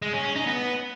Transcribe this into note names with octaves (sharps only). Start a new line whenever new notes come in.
G#3
C#4
C#4
D#4
B3